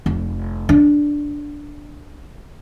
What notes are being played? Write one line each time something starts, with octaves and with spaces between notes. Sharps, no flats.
F1
D4